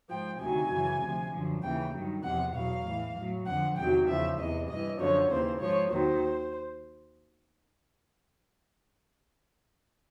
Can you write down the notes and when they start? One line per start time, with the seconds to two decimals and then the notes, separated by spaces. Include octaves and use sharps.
0.09 G#2 F3 G5
0.40 D2 C3 D#3 F#3 G#5
0.71 F#2 C#3 E3
1.02 D2 C3 F3
1.32 F#2 D3 F3
1.63 D#2 C#3 E3 G5
1.94 G2 D#3 F#3
2.24 E2 C3 F3 F#5
2.54 E2 B2 F#3 F5
2.85 A2 E3
3.16 A2 F#3
3.46 F2 D3 F3 F#5
3.77 E2 C3 D#3 F#3 G5
4.08 E2 C#3 F3 E5
4.38 E2 C3 E3 D#5
4.69 G2 E3 D#5
4.99 F#2 D3 F3 C#5
5.30 D#2 C#3 E3 C5
5.60 G#2 F3 C#5
5.91 D#2 D#3 F#3 C5